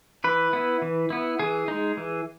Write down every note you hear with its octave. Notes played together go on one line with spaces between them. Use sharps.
E3 B4
B3 E4
E3
B3 E4
E3 G#4
G#3 D#4
E3